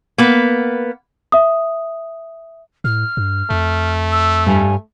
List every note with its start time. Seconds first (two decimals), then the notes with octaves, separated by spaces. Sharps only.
0.18 A#3 B3
1.32 E5 D#6
2.84 A2 F6
3.17 G2
3.51 F2 A3
4.12 E6
4.47 G2 G3 G#5